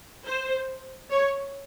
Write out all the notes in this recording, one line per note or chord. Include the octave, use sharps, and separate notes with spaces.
C5
C#5